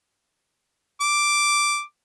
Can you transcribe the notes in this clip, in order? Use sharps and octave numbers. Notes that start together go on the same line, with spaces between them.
D6